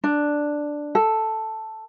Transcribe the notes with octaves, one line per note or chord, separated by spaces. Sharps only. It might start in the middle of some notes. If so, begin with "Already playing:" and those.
D4
A4